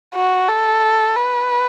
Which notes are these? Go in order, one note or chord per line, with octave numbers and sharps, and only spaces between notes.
F#4
A4
B4